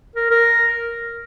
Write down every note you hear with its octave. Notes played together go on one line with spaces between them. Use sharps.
A#4
A#4